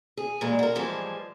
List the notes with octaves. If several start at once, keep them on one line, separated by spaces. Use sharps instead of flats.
G#4
A#2 E3 G3 G#3
F#4 A#4
A2 E3 F3 G3 G#3